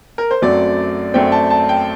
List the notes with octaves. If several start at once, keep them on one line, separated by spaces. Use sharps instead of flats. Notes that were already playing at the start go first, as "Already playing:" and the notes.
A#4
C5
F#2 F#3 A3 C4 D5
F#2 F#3 A3 C4 G5
A5
A5
G5